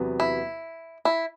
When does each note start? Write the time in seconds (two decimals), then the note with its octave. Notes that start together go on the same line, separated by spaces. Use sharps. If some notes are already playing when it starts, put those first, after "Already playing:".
Already playing: E2 C3 F#3 B3
0.20 E4
1.05 E4